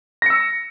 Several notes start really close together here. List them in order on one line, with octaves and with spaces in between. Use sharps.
A#6 C#7 E6